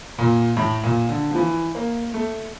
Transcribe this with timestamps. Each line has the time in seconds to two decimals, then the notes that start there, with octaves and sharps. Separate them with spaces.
0.18 A#2
0.57 A2
0.83 A#2
1.09 D3
1.31 F3
1.35 E3
1.75 A#3
2.14 A3